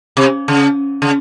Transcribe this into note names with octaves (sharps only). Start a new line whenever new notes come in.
C3
C#3
C#3